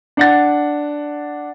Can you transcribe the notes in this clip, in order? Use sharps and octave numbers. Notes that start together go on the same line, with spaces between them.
D4 F#5 A6